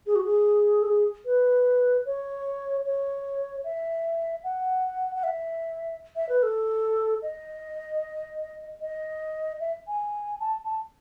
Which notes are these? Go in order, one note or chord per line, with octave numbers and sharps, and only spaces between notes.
G#4
F#4
G#4
A4
G#4
B4
C#5
C#5
E5
F#5
F#5
E5
E5
B4
A4
D#5
D#5
E5
G#5
A5
A5